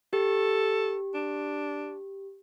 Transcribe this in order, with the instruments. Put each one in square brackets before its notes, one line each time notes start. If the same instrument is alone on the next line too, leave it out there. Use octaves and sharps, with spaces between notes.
[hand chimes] G4 [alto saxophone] A4
[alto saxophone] D4